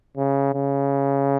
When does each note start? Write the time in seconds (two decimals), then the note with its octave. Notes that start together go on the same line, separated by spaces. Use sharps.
0.17 C#3
0.54 C#3